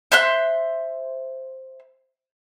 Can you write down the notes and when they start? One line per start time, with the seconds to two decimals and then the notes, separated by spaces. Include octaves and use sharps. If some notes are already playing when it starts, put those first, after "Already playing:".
0.12 C5 E5 C6 F#6